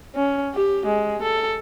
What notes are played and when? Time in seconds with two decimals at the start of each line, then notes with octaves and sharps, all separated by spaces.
0.15 C#4
0.54 G4
0.86 G#3
1.23 A4